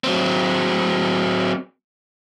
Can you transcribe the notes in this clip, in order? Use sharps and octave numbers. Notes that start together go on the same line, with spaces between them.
F#3 C4